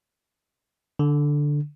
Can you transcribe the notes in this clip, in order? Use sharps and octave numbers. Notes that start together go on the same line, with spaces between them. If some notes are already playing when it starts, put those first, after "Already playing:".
D3